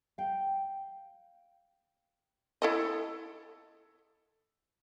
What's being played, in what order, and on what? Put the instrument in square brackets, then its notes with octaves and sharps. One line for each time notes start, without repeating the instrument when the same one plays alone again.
[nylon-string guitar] F5 G5
[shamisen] E4 A4 D#5